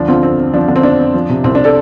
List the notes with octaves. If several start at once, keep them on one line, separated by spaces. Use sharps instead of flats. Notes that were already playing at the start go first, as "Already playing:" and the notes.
Already playing: D2 F3 D4
D3 C4 F4
F2 C4
F2
F3 D4
D3 D4
C4
F2 D4
F2
F3
C3
C2 C4
D4
A4 D5